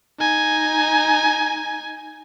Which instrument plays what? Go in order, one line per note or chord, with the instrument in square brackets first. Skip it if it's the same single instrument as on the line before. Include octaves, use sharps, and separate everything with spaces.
[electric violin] D#4 G#5